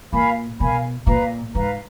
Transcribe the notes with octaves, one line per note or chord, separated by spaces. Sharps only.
A#2 A#4 F5 G#5 B5
B2 A#4 F5 G#5 B5
A#2 B4 F5 A#5
G#2 B4 F5 A#5